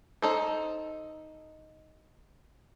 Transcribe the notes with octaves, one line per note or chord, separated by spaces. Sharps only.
D#4 A4 C5